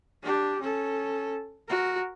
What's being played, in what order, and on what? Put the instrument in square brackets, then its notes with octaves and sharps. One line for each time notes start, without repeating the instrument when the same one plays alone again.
[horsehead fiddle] D4 G4
C#4 A4
F#4 A#4